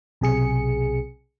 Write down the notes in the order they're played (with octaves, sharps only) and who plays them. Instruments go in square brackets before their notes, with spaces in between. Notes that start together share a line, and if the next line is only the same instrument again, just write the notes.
[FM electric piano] B1 C3 G#4 C#7